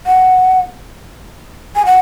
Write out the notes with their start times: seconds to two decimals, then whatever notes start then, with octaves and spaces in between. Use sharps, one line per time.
0.06 F#5
1.76 G#5
1.86 F#5